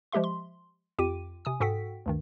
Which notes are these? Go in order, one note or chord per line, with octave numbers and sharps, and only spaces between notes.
F3 G#3 G4 E5 C6
C6
F2 F4 G4 G5 D6 D#7
C3 G#5 D#6
G#2 F#4 A4 F#5 G5 B6
D2 G2 D#3